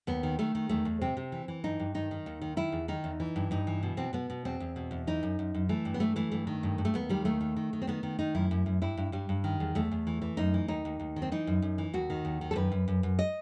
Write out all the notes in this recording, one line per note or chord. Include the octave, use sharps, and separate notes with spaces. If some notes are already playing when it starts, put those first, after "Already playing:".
D#2 B3
D#3
D#3 A3
D#3
E2 A3
E2
C3 C4
C3
E3
E3
G2 D#4
G2
D#3 D#4
D#3
D#2
D#3
D#3 E4
E2
D#3 D#4
E2
E3
G2
G2 D#4
E3
B2
B2 C4
B2 B3
B2
E2 C4
E2
B2
E2
E3 D#4
F#2
F#2
F#2
E3 A3
G2
B3
E3 A3
E3 A3
G2 A3
D#3
G2
G2
A3
D#2 B3
D#3 G3
D#2 A3
D#3
D#3
D#3
C4
D#3 B3
D#3
D#3 D#4
F#2 E4
F#2
F#2
G2 E4
G2
G2 G3
G2
D#3
E2
E2 A3
E2
E3
E3
F#2 D#4
E3
D#2 D#4
D#2
D#2
D#3
C4
E3 D#4
F#2
F#2
E3
D#2 F#4
D#3
D#2
D#3
A4
F#2 B4
F#2
F#2
F#2
D#5